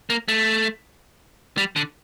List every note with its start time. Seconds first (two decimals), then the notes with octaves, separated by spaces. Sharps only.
0.10 A#3
0.28 A3
1.57 G3
1.76 D3